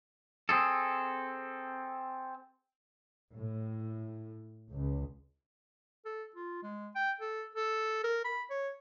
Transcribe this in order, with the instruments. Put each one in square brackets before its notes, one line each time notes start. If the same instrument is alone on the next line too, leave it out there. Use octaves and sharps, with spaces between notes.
[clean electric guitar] C4 G#4 A4
[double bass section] A2
C#2
[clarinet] A4
F4
G#3
G5
A4
A4
A#4
B5
C#5